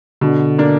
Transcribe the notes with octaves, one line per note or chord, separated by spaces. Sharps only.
B2 D3
A#3 D4